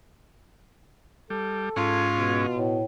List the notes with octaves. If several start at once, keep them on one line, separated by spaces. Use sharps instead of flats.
G3 A4
G#2 C#4 F4
B2
A2